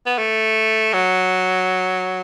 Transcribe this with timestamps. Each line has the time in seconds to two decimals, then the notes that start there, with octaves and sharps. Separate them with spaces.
0.06 B3
0.18 A3
0.93 F#3